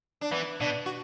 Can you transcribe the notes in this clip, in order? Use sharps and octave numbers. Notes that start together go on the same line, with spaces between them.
D4
E3 B3
B2 D4
F#4